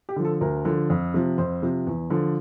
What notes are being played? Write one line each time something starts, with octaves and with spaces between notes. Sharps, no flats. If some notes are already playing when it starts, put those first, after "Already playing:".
G4
D3 F3
A4
D2 A#4
D3 F3
F2
C3 F3
F2 C5
C3 F3
E2
D3 F3